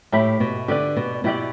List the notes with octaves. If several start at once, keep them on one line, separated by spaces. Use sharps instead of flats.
A2 G4 E5 B5
B2
D3 G4 B4 D5
B2
B2 E4 G4 D5